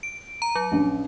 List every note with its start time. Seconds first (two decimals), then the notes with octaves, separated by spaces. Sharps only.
0.03 D7
0.42 A#5
0.55 F#3
0.72 A#1 C#4